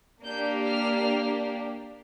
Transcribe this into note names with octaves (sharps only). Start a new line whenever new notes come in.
A#3 D4 G4 G6
F6